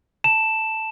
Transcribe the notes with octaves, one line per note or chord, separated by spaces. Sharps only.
A5 E7